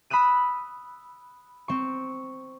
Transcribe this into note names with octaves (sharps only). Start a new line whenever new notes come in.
B5 D#6 E6 F#6 D#7
C4 C#6